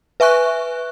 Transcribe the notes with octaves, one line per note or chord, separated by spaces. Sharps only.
B4 E5 G#5 C#6 F#6